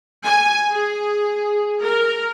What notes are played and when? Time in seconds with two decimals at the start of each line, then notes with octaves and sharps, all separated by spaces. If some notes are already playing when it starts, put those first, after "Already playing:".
0.25 G#5
0.73 G#4
1.82 A#4